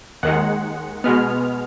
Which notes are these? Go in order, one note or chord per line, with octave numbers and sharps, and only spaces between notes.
D#2 D#3 G#3 F#5
B2 G#3 B3 F6